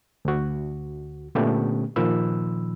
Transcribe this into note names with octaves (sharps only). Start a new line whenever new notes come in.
D2 F#4
A#2 D3 A3 B3 C#4 G4
A#2 D#3 F3 B5 E6